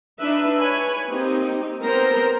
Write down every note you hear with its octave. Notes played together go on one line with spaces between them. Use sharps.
D4 D#4 B4 E5
B4 C#5 G#5 B5
A#3 C4 D#4 G4
B3 C4 A#4 C5 A#5